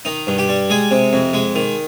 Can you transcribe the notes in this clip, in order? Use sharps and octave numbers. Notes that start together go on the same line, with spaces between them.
D#3 D#4
G2
G4
G3
G#3 G#4
C3
F2
G#3
D#3